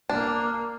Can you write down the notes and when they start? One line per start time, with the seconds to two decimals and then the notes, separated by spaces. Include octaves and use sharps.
0.09 A#3 D4